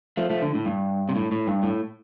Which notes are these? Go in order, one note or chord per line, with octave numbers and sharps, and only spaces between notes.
F3 A3
F3 A3
D3
A2
G2
C3
A2
A2
G2
A2